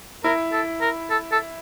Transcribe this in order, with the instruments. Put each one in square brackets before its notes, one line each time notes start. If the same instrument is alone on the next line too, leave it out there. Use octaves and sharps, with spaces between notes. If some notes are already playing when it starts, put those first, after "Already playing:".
[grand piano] E4 [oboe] A#4
[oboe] A4
A#4
A4
A4